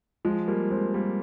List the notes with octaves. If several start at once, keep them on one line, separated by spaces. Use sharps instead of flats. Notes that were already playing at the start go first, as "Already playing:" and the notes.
F3 G#3
G3 A#3
G#3 C4
G3 A#3